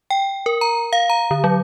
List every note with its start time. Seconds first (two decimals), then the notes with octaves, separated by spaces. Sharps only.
0.10 G5
0.46 A#4
0.61 A#5
0.93 F5
1.10 A#5
1.31 D3
1.44 F#3